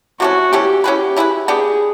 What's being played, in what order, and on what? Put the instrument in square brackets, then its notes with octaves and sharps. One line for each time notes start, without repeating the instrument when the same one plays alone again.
[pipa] C3 E3 A3 C#4 [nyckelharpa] F#4
[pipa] C3 E3 A3 C#4 [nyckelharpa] G4
[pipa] C#4 E4 G#4 B4 [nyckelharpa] G4
[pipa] C#4 E4 G#4 B4
[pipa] B3 D4 G4 [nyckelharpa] G#4